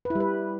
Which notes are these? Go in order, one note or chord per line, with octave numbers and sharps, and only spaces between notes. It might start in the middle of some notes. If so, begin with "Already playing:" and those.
B4
E4
G3
B4